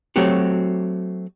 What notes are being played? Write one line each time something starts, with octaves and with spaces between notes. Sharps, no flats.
F#3 A3 C4 F#4 G4